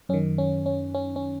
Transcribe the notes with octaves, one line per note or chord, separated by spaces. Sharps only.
F#2 D#3 C#4
C#4
C#4
C#4
C#4